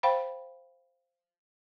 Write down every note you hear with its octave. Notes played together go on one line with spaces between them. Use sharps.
C5 F5 G5 B5